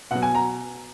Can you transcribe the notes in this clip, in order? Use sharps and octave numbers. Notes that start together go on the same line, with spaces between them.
B2 F#3 F#5
G#5
A#5